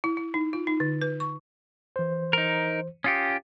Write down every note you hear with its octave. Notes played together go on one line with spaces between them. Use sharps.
E4
E4
D#4
F4
D#4
D3
B4
C#6
E3 C5
D#4 A#4
C#4 F4 G4 D#6 C#7